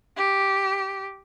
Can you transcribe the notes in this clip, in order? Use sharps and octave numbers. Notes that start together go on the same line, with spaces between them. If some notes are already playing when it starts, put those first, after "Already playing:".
G4